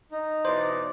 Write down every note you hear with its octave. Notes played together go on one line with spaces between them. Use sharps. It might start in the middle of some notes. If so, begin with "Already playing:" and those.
D#4
B2 E3 C5 D5